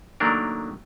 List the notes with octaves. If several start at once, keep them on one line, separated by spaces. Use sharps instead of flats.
D#3 F#3 A3 A#3 D4 A#4